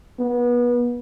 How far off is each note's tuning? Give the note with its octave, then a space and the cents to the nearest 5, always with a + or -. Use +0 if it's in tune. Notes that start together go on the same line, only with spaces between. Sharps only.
B3 -30